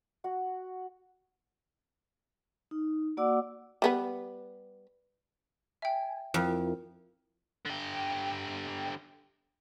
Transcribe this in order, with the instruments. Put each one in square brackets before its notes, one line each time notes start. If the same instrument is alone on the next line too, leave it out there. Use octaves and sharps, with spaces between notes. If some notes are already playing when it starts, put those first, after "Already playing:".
[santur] F#4 F#5
[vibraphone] D#4
A#3 F#4 D5 F#5 D6 E6
[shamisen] G3 B3 B4
[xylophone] E5 G5 [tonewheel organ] G#5
[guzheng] F2 [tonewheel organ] E4 F4 A#4
[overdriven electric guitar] D3 G4